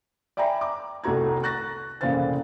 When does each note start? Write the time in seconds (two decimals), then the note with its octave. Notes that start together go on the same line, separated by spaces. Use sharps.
0.37 D5 E5 G5 G#5 A#5 B5
0.61 D6
1.04 F1 C2 A3 F#4 A#5 G#6
1.43 C#6 F#6 A6 A#6
2.01 F1 A#2 C#3 E3 C5 A6